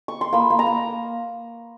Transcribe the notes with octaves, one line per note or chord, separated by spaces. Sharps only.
C#6
C6
A#3 B5
A#3
A#5
A#3